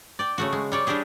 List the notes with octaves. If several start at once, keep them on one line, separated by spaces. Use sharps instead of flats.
D5 G5
C#3 A3 F#4
G#3
G3 C#5 D5
G3 D4 E4 G4 G#4